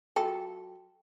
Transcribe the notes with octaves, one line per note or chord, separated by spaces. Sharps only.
F#3 F4 A4 G5